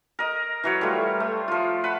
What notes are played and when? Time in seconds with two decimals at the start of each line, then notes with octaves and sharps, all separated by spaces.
0.19 A#4 D#5
0.63 E3 F#3 C#5
0.81 G3 A3 F4
1.20 A3
1.48 F3 F4
1.84 B4 F#5